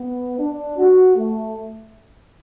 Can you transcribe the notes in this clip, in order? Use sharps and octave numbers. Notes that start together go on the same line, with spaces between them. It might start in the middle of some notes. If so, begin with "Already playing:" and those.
Already playing: B3
D4
F#4
A3